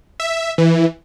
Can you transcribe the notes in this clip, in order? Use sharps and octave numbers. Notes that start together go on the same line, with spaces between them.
E5
E3